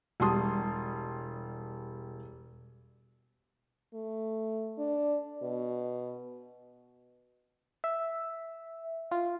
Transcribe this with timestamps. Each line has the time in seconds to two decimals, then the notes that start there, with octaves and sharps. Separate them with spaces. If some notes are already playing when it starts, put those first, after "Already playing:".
0.20 E1 G3 A5 C6 D#6
3.94 A3
4.78 D4
5.42 B2
7.84 E5
9.11 F4